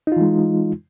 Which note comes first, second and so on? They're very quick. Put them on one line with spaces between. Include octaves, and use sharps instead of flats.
D#4 F4 E3 G#3